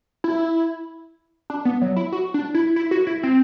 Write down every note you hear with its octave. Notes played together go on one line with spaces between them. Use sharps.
E4
D4
B3
F#3
E4
F#4
D4
E4
E4
F#4
E4
C4